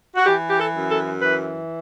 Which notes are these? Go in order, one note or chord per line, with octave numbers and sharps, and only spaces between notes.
F#4
E3 G4
G4
A4
F#2
A4
E3 B4